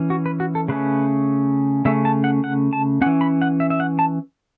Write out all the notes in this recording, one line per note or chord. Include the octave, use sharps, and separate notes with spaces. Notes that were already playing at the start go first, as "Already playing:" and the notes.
Already playing: E3 C#4
F#4
B4
F#4
A4
C#3 A3 C#4 B4
C#3 A3 C#4 E5
A5
F#5
F#5
A5
E3 C#4 F#5
B5
F#5
E5
E5
F#5
A5